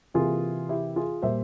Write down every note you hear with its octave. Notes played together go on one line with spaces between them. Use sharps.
C3 E3 A#3 F4 G#4
E4 G4
F4 G#4
A#2 G3 A#3 C5 E5